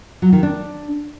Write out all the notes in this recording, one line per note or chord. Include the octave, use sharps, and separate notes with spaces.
F#3
D#3
D4